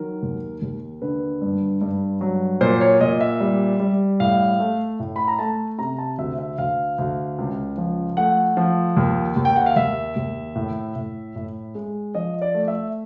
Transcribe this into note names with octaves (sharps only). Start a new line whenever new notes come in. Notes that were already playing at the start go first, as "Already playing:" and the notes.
Already playing: D#3 F#3 A#4
D#2
D#2
D3 B4
G2
G2
F#3
A#2 C5
C#5
A#2 D#5
E5
G3
G3
A2 F5
A3
A2
B5
A#5
A3 A5
C3 A#5
A5
D2 E5
E5
D2 F5
D2
C#2
F3
A3 F#5
F3
D#2
D#2
G5
F#5
F5
D#2 E5
D#2
A2
A2
A2
G#3
F3 D#5
D5
A3
E5